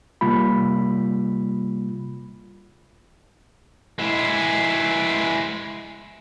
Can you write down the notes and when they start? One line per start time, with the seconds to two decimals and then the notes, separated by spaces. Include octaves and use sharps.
0.21 C3 G3 A#3 F4 B5
3.99 G#3 E4